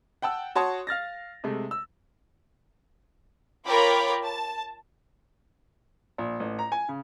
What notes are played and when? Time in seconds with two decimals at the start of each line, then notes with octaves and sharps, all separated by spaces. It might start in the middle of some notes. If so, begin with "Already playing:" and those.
0.22 F#5 G5 A5 E6
0.55 F#4 C#5 A5 C6 D#6
0.87 F5 F6 A6 A#6
1.44 C3 G#3 A3
1.71 E6
3.65 F4 A#4 C#5 G5 B5 D6
4.25 A5
6.18 A#1
6.40 A1
6.59 A#5
6.72 G#5
6.89 C#3